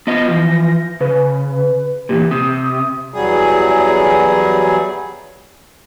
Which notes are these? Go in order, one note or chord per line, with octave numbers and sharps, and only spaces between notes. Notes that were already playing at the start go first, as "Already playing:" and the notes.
B3 F4 D#5 A#6
E3 F3
C#3 B4
E2 G2 A#2 G4
C3 D#6
E2 F#3 G3 G#4